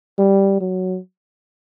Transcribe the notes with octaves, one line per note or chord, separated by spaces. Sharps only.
G3
F#3